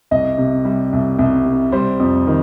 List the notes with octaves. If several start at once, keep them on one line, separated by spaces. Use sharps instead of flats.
C2 D#5
C3
G3
C2
C2
C3
G3 C5
F2
D#3